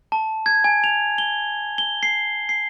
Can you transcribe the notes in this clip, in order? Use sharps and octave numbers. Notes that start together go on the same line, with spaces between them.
A5
G#6
G#5
F7
G7
G7
C7
C7